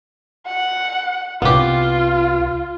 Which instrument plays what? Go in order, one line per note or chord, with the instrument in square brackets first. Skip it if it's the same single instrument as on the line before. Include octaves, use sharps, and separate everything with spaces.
[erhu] F#5
[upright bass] C2 [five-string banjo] B3 G4 [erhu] F4